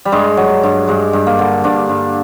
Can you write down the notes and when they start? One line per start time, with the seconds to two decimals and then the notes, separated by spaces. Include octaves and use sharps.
0.05 G3
0.12 G2 G#3
0.37 F#3
0.63 G2
0.88 G2 G#3
1.13 G2
1.26 A#3
1.39 D3
1.64 G2 D4
1.89 G2